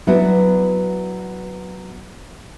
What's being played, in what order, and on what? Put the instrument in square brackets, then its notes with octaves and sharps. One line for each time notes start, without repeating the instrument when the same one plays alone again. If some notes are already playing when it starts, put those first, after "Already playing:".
[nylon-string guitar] F#3 B3 D4 E4 F#4